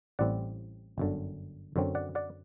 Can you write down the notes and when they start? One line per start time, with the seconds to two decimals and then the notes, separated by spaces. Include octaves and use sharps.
0.19 A1 A2 G3 C4 D5 F#5
0.98 G1 F#2 D3
1.76 F#2 D3 F#3 C4
1.95 D5 F#5
2.15 D5 F#5